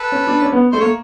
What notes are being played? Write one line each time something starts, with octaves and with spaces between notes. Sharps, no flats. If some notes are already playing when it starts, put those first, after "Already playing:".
Already playing: A4 B4
C#4
D4
C#4
B3
A3 C5
A#3 C#5